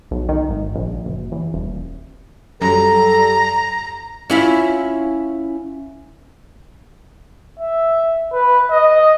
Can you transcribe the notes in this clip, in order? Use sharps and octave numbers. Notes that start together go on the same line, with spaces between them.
B1
D#3
G#1
A#1
F#1
E2
D#1
F#2 G3 A4 A#5
C#4 E4 F4
E5
B4
D#5